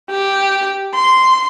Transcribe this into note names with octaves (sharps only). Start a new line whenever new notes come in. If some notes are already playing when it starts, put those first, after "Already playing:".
G4
C6